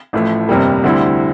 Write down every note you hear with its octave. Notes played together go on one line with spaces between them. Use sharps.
A1 A2 F3 A3
G1 F2 C3 G3 A#3
D2 D3 G3 C4 E4